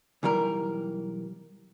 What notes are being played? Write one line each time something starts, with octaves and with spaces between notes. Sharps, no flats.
B1 E3 G3 A#4